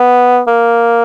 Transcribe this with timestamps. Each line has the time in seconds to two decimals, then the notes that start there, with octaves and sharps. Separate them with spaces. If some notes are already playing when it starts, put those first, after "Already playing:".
Already playing: B3
0.47 A#3